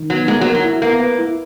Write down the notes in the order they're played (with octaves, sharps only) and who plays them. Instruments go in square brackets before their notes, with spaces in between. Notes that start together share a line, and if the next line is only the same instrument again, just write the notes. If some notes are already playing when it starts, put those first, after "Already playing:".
Already playing: [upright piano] D#3
[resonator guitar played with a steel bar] F#3 [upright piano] B3
[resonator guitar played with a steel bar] G#3 [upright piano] A#3
[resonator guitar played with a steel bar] F#3
[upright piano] A#4
[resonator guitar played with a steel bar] F#3
[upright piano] E4
[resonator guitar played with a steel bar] A#3 [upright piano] B3
[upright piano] B4
E4